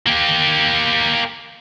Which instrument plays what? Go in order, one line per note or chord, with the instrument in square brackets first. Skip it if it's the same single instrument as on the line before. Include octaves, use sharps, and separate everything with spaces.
[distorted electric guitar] A#3 G4